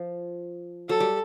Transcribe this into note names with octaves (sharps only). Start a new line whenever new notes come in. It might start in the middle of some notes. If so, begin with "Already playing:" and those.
Already playing: F3
F#3 A4
G3